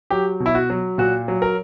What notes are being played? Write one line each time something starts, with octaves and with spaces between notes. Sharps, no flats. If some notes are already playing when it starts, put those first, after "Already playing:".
F#3 G4
B2
E4
F#4
F#3
A#2 F#4
F#3
A#4